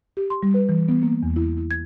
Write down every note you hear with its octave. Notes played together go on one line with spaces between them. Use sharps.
G4
C6
G3
B4
E3
B3
A#3
E2
E4
E4
G#6